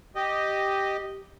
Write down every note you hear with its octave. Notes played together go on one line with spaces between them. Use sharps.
G4 D#5